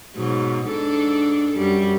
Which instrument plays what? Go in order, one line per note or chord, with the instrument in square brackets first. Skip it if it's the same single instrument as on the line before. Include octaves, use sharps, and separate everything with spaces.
[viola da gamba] G#2 B2 F#3
G#2 D4 A4
F#2 G3